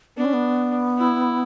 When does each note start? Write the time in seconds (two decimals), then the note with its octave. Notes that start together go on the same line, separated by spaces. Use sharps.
0.17 B3 D4
0.25 C#4
0.33 B3
0.98 E4